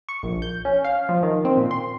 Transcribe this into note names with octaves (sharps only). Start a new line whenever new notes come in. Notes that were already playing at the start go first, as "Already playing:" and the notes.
C#6
A#1
G6
C#4
F5
F3
D#3
C4
A#2
C6